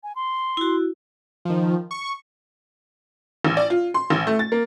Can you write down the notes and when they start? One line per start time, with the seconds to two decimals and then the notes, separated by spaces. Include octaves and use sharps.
0.03 G#5
0.16 C6
0.57 E4 F#4
1.45 D#3 F3
1.91 C#6
3.45 A1
3.57 D5
3.70 F4
3.94 C6
4.10 A1
4.27 A3
4.39 A6
4.52 A#3